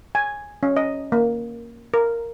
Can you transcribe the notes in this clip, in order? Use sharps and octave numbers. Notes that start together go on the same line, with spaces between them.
G#5
C#4
D#5
A#3
A#4